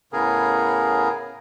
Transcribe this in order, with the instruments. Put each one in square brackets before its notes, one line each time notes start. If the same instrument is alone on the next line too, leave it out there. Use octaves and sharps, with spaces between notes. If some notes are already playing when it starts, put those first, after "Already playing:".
[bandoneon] A2 C#3 B3 G#4 A#4